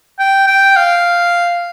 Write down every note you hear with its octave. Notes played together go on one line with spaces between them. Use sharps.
G5
G5
F5